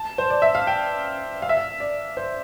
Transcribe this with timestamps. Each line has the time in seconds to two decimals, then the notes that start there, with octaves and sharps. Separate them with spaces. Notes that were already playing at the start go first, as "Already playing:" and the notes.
Already playing: A5
0.18 C5
0.30 D5
0.42 E5
0.55 F5
0.67 G5
1.42 F5
1.49 E5
1.57 F5
1.80 D5
2.17 C5